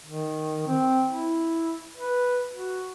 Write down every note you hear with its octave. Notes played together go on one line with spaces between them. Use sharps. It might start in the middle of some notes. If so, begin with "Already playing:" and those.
D#3
C4
E4
B4
F#4